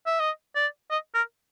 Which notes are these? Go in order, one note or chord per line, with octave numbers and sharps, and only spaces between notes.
E5
D#5
D5
D#5
A#4